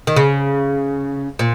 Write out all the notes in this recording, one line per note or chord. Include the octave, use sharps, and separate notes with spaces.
D#3
C#3
A#2